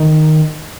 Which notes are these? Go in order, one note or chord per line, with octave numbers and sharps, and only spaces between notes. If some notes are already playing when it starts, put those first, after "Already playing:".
Already playing: D#3